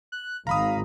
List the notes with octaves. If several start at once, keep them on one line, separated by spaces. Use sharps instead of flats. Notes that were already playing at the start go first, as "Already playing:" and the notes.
F#6
G#1 F5 A#5 B5 D#6